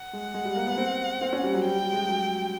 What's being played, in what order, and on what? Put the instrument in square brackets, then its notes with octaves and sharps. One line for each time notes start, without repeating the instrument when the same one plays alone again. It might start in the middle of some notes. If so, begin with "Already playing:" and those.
Already playing: [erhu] F#5
[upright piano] G#3
G#3
G3
A#3
B3
C4
C4
C#4
G3
F#3
[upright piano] G3 [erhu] G5
[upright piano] G3
G#3
F#3